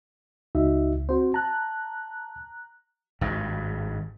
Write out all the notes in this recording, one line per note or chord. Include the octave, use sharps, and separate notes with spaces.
C#2 D#4 F#4 E5
C4 F#4 C5
A5 A#5 F#6
G#1 G2